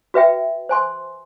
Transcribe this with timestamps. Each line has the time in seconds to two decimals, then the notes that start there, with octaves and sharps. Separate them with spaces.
0.14 F#4 B4 E5 G5
0.69 C5 G#5 C6